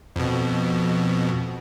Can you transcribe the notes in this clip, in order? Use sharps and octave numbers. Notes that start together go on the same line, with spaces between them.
F2 B2